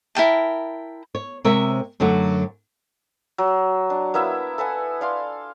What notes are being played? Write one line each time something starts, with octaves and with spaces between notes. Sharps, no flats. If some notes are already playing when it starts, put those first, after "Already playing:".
E4 A#4 G5 A5
C#5
C3 G#3 A#4 C#5 E5
F#2 D3 F#3 A3 F#4
F#3
D4
A#3 B3 E4 E5
A4 B4 F#5 G#5
D5 F5 C6